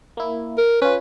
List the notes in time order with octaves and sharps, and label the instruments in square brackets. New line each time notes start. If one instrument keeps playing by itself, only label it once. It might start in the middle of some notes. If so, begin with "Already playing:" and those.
[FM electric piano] A#3 E4
[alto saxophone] A#4
[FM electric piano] C#4 F4 [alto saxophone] B4